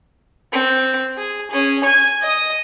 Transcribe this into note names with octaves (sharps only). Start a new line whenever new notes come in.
C4
G#4
C#4 G#4
G#5 G#6
D#5 D#6